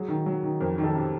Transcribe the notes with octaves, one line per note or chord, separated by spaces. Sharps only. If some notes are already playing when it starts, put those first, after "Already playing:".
Already playing: F#3 G#4
D#3
F#3
D#3
F2 A#4
D#3
A4
C3